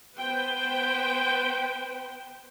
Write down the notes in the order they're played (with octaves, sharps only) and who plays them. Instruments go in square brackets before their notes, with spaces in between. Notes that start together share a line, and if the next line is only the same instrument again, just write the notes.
[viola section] B3 B4 C5 G5